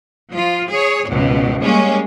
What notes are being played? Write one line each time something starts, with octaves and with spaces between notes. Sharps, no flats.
F3 F4
G#4 C#5
G#1 C#2 B2
G3 G#3 A#3 C#4